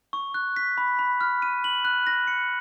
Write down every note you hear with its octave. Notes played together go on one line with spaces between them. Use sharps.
C#6
F#6
B6
B5
B5
F6
D#7
F#7
F#6
A#6
C#7